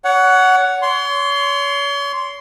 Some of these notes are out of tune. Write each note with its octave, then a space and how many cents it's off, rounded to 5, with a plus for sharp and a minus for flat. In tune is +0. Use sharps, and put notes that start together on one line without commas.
C#5 +30 F#5 +5
C#5 +35 C6 +0